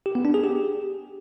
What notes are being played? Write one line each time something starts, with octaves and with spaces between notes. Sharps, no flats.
G4
B3
D4
G#4
G4